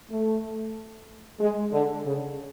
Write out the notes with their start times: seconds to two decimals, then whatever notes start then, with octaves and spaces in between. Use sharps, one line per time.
0.10 A3
1.39 G#3
1.72 D3
2.04 C#3